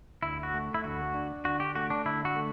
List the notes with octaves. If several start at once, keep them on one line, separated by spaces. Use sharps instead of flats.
D2 E4
F#4
A3
E4
D2 F#4
D4
D3 F#4
G4
A3 F#4
D4
D3 E4
F#4
A3